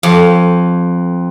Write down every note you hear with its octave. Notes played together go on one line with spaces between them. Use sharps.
F2